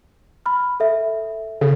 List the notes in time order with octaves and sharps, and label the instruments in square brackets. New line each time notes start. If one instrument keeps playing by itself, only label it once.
[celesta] B5 F6
A4 E5
[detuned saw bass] C#3 [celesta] A4